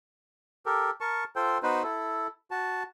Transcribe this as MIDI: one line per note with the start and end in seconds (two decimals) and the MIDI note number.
0.66 0.91 67
0.66 0.91 69
0.66 0.91 70
1.01 1.24 70
1.01 1.24 81
1.01 1.24 85
1.36 1.58 65
1.36 1.58 69
1.36 1.58 72
1.36 1.58 79
1.63 1.83 59
1.63 1.83 63
1.63 1.83 66
1.63 1.83 71
1.63 1.83 72
1.83 2.27 64
1.83 2.27 69
2.51 2.83 66
2.51 2.83 81